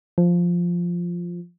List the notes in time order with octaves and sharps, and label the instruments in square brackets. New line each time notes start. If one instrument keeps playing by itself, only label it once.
[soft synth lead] F3